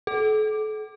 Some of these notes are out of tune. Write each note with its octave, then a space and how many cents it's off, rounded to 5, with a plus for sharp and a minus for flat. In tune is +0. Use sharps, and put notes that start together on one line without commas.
A4 -40